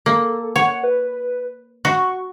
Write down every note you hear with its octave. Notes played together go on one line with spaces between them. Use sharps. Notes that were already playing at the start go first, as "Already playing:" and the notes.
A#3 A4
C#5 F#5
B4
F#4 C#6